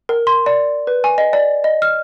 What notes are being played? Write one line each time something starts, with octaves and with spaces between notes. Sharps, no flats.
A#4
C6
D5
B4
G#5
D#5
D5
D#5
F6